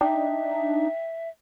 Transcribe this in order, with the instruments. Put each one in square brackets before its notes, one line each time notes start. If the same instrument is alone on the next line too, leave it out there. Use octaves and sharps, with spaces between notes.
[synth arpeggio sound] D4 D#4 [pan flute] E5 [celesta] G5